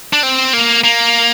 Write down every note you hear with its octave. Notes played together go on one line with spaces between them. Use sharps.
D4
C4
A#3
A#3